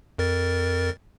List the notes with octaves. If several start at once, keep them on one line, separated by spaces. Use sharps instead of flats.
F2 A#4 A6